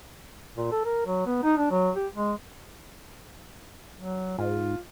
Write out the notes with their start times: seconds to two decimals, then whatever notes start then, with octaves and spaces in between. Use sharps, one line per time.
0.57 A#2
0.72 A4
0.85 A#4
1.06 F#3
1.27 B3
1.43 D#4
1.57 D4
1.71 F#3
1.96 G4
2.14 G#3
3.97 F#3
4.39 G#2 F4